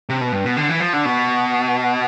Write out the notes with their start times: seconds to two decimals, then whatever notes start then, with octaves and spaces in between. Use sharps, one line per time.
0.09 C3
0.21 B2
0.32 G2
0.45 B2
0.57 D3
0.69 E3
0.80 F3
0.93 D3
1.05 B2